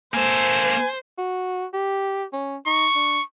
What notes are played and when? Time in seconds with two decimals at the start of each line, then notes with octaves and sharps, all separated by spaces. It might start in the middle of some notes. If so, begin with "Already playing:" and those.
0.14 A#3 A4 C5 G#5
1.18 F#4
1.74 G4
2.33 C#4
2.66 D#4 C#6
2.95 D4